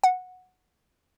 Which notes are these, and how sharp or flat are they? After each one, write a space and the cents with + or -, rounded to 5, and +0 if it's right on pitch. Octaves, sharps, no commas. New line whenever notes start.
F#5 -10